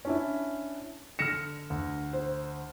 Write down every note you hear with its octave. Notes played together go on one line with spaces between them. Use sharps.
C#4 D4 E4
D3 F6 A#6 C#7 E7
D2
C5